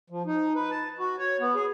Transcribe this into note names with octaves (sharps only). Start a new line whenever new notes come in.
F3
D#4
B4
A5
F#4
C#5
B3
G#4